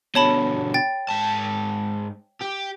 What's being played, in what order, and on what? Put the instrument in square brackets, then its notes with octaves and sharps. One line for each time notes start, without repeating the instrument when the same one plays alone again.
[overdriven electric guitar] B2 D3 [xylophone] C#5 A5 B5
[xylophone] G5 A6
[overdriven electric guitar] G#2 A5
G4